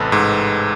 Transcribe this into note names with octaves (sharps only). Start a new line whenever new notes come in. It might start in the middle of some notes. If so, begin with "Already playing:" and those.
Already playing: A1 C3 A4 B4
G#2